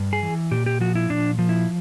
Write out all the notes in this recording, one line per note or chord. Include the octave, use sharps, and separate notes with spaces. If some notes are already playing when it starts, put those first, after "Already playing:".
Already playing: G2
G#4
E3
A#2 G4
G4
F3 F#4
E4
A#2 D4
F3
E4